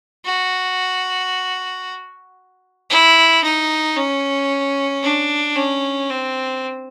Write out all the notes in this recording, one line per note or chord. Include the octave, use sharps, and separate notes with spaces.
F#4
E4
D#4
C#4
D4
C#4
C4